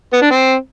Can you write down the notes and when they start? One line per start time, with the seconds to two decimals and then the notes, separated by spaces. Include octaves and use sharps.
0.13 B3
0.22 D4
0.31 C4